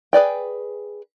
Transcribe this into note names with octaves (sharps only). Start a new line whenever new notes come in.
G#4 B4 D5 G5